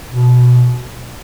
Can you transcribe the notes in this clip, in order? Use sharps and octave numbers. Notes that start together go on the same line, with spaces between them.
B2